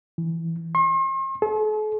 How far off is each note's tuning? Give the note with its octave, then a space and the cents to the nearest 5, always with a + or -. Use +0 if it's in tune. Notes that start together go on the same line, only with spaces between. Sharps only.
E3 +0
C6 +45
A4 -45